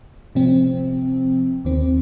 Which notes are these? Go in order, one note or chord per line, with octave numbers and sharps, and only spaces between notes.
C3 F3 C4
D#2 D#3 C4